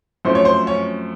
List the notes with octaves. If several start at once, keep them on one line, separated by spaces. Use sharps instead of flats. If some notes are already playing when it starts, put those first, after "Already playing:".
F#2 F3 A3 C4 C5
C#5
C5
C#4 C#5